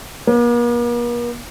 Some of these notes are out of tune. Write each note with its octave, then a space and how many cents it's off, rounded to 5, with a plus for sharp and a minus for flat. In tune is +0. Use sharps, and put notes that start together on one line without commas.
A#3 +45